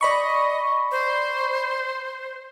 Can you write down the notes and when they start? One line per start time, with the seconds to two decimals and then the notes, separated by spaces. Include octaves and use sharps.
0.01 D5 D#5 B5 C#6
0.91 C5